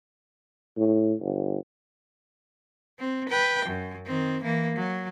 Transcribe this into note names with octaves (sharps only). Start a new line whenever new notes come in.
A2
G1
C4
B4 G5
F#2
D#3 C4
E3 A#3
F#3